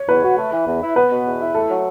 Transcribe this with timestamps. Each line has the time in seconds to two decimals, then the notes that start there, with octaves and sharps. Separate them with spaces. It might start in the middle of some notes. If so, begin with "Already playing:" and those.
Already playing: C#5
0.09 E2 B4
0.23 F#4
0.38 A3
0.53 E3
0.67 E2
0.82 E4
0.96 B3 B4
1.11 B2
1.26 E2
1.40 E4
1.54 A3 A4
1.69 F#3